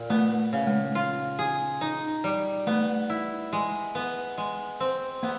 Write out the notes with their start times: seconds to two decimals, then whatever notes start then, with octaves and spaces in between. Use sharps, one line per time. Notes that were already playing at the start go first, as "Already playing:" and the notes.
Already playing: A#2
0.10 A3 B3
0.53 C#3
0.67 G#3
0.95 F4
1.39 G#4
1.81 D#4
2.24 G3
2.67 A3 B3
3.10 E4
3.53 G#3
3.95 B3
4.38 G#3
4.80 C4
5.23 A#3 B3